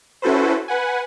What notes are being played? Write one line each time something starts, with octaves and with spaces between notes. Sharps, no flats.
C#4 E4 F#4 A4 B4 C5
B4 F#5 G#5